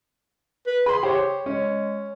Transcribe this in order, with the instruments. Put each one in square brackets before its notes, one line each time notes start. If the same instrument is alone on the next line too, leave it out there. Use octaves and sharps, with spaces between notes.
[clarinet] B4
[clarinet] G#4 [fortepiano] B5 C6
[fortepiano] G4 C5 C#5
[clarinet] G#3 [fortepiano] C#4